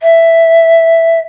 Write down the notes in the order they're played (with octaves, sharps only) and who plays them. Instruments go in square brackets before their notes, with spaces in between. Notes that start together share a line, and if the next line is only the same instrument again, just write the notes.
[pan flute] E5